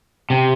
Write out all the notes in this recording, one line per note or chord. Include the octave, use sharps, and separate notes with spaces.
C3